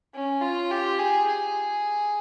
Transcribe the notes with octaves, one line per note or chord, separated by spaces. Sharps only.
C#4
F4
G4
G#4
G#4